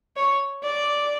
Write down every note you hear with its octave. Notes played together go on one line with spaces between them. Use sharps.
C#5
D5